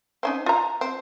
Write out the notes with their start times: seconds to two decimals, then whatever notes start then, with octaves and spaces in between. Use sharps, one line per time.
0.23 C4 C#4 D#4
0.46 F4 A#5
0.81 C4